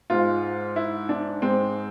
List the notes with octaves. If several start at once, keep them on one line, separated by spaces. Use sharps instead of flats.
G#2 G#3 F4
E4
D4
G#2 G#3 C4